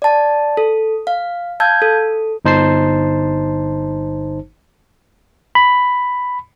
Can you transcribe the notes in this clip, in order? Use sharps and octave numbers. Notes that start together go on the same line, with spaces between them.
D5 A5
A4
F5
F5 A5 E6 G6 G#6
A4
G1 D#4 C5 A5 C7
B5